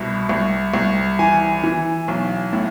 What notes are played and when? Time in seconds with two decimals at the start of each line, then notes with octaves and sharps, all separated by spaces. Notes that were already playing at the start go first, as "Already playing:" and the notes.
Already playing: C2 B2
0.29 C2
0.74 C2
1.19 E3 G#5
1.63 E3
2.08 B1
2.53 A2